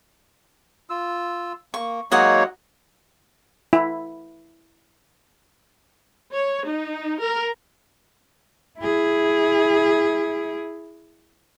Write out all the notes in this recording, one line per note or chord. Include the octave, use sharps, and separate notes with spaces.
F4 E6
A#3 C#6
F#3 G#3 A#3 D#4 F#4 C#5 D#5 F#5
E4
C#5
D#4
A#4
E4 G#4